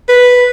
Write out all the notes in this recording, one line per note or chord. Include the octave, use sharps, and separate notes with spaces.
B4